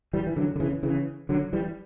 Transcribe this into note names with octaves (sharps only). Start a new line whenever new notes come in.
E3 G3
E3
D3 F#3
D3
C#3 E3
C#3 E3
D3 F#3
E3 G3